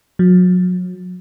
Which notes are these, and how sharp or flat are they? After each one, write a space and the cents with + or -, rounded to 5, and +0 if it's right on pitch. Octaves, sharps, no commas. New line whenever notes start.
F#3 -35